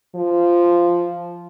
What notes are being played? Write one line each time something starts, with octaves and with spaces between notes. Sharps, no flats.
F3